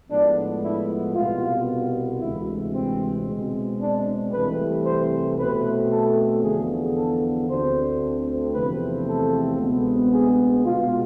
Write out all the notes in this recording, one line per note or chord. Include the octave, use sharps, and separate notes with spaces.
A2 F3 G#3 B3 D4
E4
C2 B2 B3 F4
D2 C3 E3 G#3 E4
C4
B2 G#3 C4
D4
C2 C3 E3 A3 C4 B4
C5
B2 A3 C4 B4
A4
E2 D3 F3 B3 G#4
A4
D2 D3 A3 C4 C5
E2 C3 F3 A3 C4 B4
A4
D2 C3 G#3 B3
G#4
B2 G#3 B3 F4